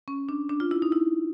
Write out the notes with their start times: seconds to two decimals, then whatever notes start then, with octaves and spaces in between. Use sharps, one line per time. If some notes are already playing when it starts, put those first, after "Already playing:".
0.08 C#4
0.29 D4
0.49 D4
0.60 F4
0.71 E4
0.82 D#4
0.92 E4